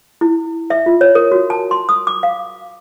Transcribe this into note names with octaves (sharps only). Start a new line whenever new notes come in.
E4
E5
F4
C#5
A#4
F#4
A5
C6
D#6
D6
F5